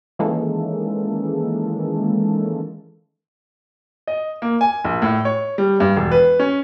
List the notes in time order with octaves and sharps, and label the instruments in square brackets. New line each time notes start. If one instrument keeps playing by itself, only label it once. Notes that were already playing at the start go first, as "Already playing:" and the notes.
[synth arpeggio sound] D#3 E3 G#3 A#3 C#4 A4
[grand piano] D#5
A#3
G#5
A#1
A2
C#5
G3
G2
E1
B4
C#4